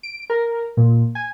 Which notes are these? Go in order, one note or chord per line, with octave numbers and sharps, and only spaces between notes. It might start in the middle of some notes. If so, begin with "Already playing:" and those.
D7
A#4
A#2
G#5